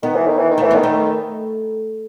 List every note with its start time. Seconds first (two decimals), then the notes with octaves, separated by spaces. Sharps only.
0.03 D#3 B3
0.15 E3
0.27 D#3
0.38 E3
0.51 D#3
0.58 A3
0.63 E3
0.71 D#3 B3
0.83 A3